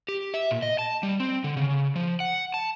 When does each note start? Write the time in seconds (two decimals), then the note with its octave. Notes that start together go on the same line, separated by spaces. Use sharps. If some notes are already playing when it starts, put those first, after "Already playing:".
0.08 G4
0.34 E5
0.51 A#2
0.62 D#5
0.79 A5
1.03 G3
1.20 C4
1.44 D3
1.57 C#3
1.96 F3
2.20 F#5
2.54 A5